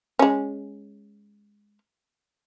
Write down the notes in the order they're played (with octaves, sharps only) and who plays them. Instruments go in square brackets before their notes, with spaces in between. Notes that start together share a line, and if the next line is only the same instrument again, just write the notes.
[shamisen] G#3 C#4